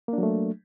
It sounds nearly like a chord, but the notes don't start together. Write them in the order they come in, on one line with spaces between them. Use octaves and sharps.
A#3 D4 F#3 A3